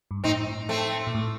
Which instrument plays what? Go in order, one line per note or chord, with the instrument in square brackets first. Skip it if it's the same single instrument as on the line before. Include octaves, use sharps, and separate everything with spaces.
[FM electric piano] G2
[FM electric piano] A2 [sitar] C4 D#4
[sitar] A3 C4
[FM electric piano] A#2
A2